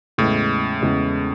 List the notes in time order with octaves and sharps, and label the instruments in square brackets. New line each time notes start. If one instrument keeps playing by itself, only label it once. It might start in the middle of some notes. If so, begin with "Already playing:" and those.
[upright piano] E2 C#3 G#3 [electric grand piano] A2
[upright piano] E2 C#3 G#3